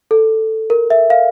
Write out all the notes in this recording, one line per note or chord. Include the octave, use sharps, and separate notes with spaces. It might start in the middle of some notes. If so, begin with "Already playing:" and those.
A4
A#4
E5
F5